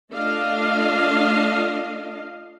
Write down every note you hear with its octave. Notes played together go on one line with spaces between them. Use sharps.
A3 D4 F4 D#5 F5